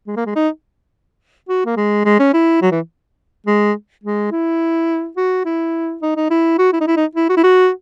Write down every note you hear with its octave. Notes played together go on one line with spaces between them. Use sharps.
G#3
A#3
G#3
D#4
F#4
A#3
G#3
G#3
C#4
E4
F#3
E3
G#3
G#3
E4
F#4
E4
D#4
D#4
E4
F#4
E4
D#4
E4
D#4
E4
F#4
E4
F#4